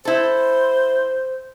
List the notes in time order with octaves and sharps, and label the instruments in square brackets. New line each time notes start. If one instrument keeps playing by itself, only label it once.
[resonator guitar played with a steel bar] E4 A4 [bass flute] C5